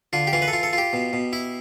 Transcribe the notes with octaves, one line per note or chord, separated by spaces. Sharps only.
D3 F4
G4
E3 F4
B4
A4
F4
A4
F4
G4
B2
B2
E4